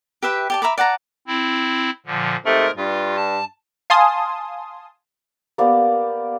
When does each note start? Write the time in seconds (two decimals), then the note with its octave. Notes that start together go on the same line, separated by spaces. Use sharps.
0.23 G4 B4 E5 G5
0.50 G4 D5 A5
0.62 E5 A#5 B5 D6
0.78 D5 F#5 A5 A#5
1.27 C4 E4
2.06 A#2 D3 F3
2.45 G#2 C3 A3 A#4
2.76 G2 F4
3.16 A5
3.90 F5 G#5 A5 C6 D#6
5.58 A#3 B3 G4 D5